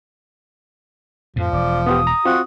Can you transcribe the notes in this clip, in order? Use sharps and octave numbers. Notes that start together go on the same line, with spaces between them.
F2 A2 F3
E1 D5
B3 F4 G4 D#6
A#5
C4 F4 F#4